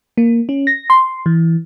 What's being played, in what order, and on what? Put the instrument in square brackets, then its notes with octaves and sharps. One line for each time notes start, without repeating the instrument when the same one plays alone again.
[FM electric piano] A#3
C#4
A#6
C6
E3